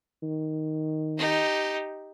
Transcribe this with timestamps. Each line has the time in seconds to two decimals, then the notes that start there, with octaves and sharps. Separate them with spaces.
0.23 D#3
1.18 D#4 G4